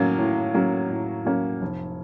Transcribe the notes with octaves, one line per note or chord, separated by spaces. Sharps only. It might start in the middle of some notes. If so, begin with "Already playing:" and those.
Already playing: A2 F#3 A#3 C#4
A2
F#3 A#3 C#4
A2
F#3 A#3 C#4
F1